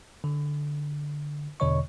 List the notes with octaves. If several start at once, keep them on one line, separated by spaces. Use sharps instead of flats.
D3
E2 B2 D3 C#5 D#5 C#6